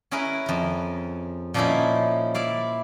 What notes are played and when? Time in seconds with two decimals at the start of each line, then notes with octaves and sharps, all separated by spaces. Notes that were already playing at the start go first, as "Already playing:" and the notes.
0.11 C#4 E4 G#4 A#4 B4
0.46 F2 A#4
1.54 A#2 F3 A#3 C#4 D#4 E4
2.34 E4 D5 F5